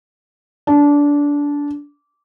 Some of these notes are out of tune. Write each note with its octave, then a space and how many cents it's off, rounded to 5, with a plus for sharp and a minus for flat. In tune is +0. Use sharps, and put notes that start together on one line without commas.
D4 -20